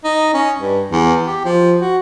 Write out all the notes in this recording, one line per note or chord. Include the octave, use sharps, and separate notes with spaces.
D#4
C#4
G2
E2
G4
F3
F#4